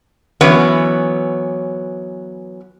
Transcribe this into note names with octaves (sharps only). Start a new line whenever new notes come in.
E3 F#3 B3 C#4